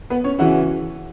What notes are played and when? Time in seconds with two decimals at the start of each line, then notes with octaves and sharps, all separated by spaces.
0.10 B3 B4
0.24 C#4 C#5
0.39 C#3 E3 C#4 E4 F#4 F#5